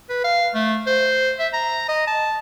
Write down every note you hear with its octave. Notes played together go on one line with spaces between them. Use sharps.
B4
F5
A3
C5
E5
A#5
D#5
A5